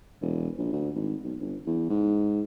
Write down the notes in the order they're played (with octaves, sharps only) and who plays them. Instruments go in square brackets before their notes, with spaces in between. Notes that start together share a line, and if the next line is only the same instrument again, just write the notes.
[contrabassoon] E1
A#1
D2
G#1
B1
G1
E2
G#2